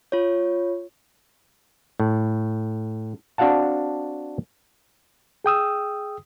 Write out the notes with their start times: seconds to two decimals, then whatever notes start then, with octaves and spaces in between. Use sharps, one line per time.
0.12 F4 C#5
2.00 A2
3.38 C4 D4 F#4 F5 F#5 A5
5.44 G#4 G5 D#6 E6